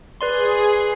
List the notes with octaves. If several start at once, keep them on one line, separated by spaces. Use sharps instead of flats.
G#4 B4 D5 C6 C7